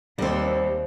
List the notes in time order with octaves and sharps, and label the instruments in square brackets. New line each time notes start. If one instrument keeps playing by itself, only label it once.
[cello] D#2 [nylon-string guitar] G3 C4 [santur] C5 F5